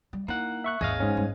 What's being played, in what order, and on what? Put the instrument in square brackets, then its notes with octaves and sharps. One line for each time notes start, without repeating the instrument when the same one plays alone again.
[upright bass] G3
[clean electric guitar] A#3 F#5 [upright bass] D#4 E4
[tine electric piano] E5 C#6 F#6
[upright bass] G#1 D#2 [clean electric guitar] G#4 D#5 F5
[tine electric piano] G#2 C#4
[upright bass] G1 G2